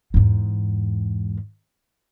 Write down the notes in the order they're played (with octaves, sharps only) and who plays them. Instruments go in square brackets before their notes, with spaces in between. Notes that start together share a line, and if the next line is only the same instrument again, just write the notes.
[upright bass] E2 G#2